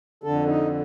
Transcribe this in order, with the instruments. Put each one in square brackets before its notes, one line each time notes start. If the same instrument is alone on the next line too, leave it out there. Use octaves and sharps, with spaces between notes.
[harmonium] F2 D3 A4
D#4